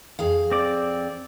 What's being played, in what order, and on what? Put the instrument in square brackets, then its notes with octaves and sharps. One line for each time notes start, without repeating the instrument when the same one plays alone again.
[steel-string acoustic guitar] F2 G#4 F5
[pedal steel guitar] C4 D5